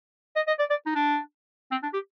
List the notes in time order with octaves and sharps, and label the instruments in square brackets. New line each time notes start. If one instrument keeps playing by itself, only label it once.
[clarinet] D#5
D#5
D5
D5
D#4
D4
C4
D4
G4